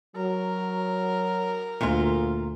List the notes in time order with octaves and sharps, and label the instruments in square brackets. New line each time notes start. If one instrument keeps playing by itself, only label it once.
[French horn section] F#3 [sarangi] A#4
[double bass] D2 [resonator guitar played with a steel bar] A#2 F4